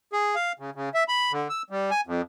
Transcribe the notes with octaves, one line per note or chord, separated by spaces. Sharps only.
G#4
F5
C#3
C#3
E5
B5
D3
E6
G3
G#5
F2